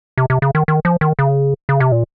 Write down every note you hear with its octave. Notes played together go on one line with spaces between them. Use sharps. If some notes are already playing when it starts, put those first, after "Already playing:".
C3
C3
C#3
D#3
D#3
F3
D#3
C#3
C#3
C3
A#2